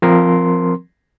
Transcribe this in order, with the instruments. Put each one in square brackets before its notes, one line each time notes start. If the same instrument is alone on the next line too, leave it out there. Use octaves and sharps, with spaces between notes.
[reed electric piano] F3 C4 A#4 C6